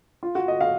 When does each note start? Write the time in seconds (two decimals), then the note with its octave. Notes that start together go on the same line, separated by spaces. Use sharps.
0.23 F4
0.35 F#4
0.48 D#5
0.61 F5